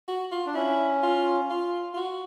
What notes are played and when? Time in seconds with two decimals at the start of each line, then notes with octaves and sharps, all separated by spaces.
0.08 F#4
0.32 F4
0.47 D4
0.55 C#4 E4
1.03 F4
1.50 F4
1.94 F4
1.97 F#4